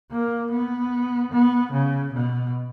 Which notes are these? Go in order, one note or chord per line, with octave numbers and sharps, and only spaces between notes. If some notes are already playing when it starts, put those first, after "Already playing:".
A#3
B3
B3
C#3
B2